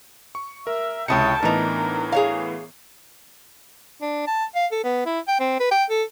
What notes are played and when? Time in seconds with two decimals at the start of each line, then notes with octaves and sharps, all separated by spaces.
0.35 C#6
0.67 A#4 E5
1.08 C#2 C3 E4 C#5 G5 A5 D#6 C#7
1.42 A2 E3 B3 D4 D#4 A#4
2.12 G#4 C#5 F5
4.02 D4
4.27 A5
4.55 F5
4.72 A4
4.84 B3
5.06 E4
5.28 G5
5.40 C4
5.60 B4
5.71 G5
5.90 A4